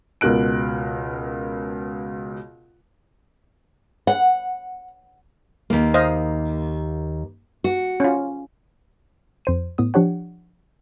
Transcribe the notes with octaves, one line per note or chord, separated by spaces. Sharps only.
C#2 B2 A#4 F#6 D7
F#5
D#2 A#3
C5 D#5 F5
F#4
C#4 F4
F2 C5 D#7
A2 B3 D#6
F3 D4 G4 C#5 F#5